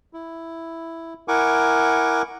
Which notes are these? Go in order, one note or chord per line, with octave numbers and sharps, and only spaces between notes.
E4
E4 A#4 F#5 G#5 C#6 D6